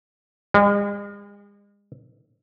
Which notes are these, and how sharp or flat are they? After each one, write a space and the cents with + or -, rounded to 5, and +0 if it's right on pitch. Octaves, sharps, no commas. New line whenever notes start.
G#3 -40